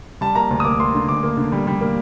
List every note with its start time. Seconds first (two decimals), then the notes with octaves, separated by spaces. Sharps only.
0.21 G3 A5
0.35 A#3 A#5
0.50 D2
0.60 D#6
0.65 A#3 D6
0.79 A#3 C6
0.95 D3
1.08 D2 D6
1.23 A#3
1.37 D3
1.52 G3
1.67 G3
1.81 A#3